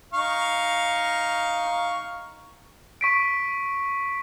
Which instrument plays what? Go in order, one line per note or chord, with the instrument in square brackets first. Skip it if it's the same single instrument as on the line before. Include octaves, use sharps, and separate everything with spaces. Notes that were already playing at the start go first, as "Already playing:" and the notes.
[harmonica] D#4 F5 C#6
[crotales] C#6 B6 D7